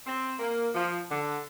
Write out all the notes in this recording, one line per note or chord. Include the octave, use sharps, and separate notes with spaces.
C4
A#3
F3
D3